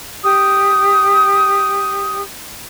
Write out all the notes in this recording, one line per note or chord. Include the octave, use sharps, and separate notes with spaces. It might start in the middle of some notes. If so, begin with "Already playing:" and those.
G4 D#6